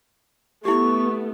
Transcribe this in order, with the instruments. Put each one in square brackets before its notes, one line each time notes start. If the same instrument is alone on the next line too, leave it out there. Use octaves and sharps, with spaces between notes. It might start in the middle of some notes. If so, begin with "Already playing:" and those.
[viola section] A3 B3 [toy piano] E4 G4 [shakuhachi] C#6